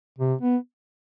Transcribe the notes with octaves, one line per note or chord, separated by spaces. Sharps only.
C3
B3